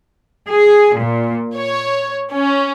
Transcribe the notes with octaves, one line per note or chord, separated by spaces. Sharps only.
G#4
A#2
C#5
C#4